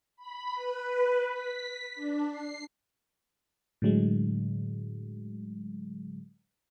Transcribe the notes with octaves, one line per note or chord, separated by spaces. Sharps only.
B5
B4
B6
D4
C7
A2 D3 F#3 G#3